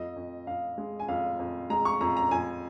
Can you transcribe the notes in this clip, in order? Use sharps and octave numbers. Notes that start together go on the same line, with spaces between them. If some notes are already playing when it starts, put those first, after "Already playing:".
Already playing: F2 D#5
F2
F2 F5
G#3
G#5
F2 F5
F2
G#3 A#5
C#6
F2 A#5
A#5
F2 G#5